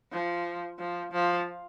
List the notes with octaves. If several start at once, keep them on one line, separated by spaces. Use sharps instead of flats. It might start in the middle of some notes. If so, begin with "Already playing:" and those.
F3
F3
F3